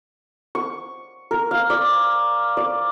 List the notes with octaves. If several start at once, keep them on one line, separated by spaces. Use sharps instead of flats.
C#6
A#4
F5
D5
D5